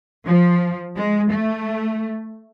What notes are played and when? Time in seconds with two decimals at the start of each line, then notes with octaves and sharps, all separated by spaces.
0.27 F3
0.96 G#3
1.32 A3